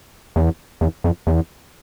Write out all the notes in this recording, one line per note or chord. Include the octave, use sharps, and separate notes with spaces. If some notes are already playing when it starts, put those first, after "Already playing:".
E2
E2
F2
E2